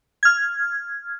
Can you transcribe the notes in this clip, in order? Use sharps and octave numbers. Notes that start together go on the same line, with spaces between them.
F6 G#6